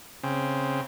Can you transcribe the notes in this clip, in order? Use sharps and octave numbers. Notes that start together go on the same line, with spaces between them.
C#3 C4